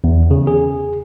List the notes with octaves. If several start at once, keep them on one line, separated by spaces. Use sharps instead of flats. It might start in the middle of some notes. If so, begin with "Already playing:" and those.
E2
C#3
G#4